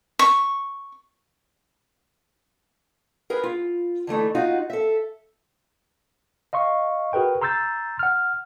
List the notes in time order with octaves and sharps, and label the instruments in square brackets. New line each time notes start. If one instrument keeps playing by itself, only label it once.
[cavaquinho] C#6
[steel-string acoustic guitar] G#4 A#4 B4
F4
D3 E3 A3 D#4
D#4 F4 F#4
A4 E5
[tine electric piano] D#5 F5 C6 C#6
F#4 G#4 A#4 B4 G5
A#5 C6 E6 G6 A6
F#5 F6